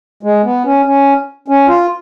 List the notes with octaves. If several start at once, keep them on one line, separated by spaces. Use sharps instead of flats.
G#3
B3
C#4
C#4
C#4
F4